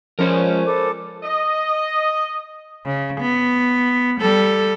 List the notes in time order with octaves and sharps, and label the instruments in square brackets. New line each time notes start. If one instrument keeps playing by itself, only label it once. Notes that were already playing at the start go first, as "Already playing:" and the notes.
[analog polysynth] F3 G#3 C#4 [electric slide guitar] A#4 C5
[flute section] A4 B5 D6
[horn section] D#5
[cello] C#3
B3
G3 A4